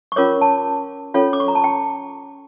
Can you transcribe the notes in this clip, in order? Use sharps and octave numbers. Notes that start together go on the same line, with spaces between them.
C#6
C#4 F4 A#4 C#5 D6
A5
C#4 F4 A4 C#5
D6
C#6
A#5
A5
G5